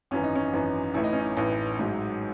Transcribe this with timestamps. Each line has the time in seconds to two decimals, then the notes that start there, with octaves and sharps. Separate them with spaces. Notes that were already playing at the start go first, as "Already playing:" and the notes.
0.11 G#1 F#2 E3 C#4
0.23 D#4
0.35 C#4
0.53 G#1 F#2 E3
0.94 A1 A2 E3 E4
1.04 D#4
1.12 C#4
1.21 D#4
1.37 A1 A2 E3
1.79 A1 G#2 F#3